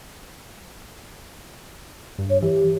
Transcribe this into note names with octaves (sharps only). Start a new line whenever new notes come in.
G2
C#5
E3 G4